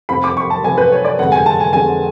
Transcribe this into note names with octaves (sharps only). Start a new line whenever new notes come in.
F1 F2 F3 B5
D6
C#6
A5
F1 F2 F3 G#5
B4
C#5
D5
F1 F2 D3 G#3 F#5
G#5
A5
G#5
F1 F2 D3 G#3 G#5